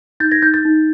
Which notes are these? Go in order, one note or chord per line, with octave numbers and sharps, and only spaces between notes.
D#4 G6 A6
G#6 A#6
D#4 G6 A6
G6 A6
D#4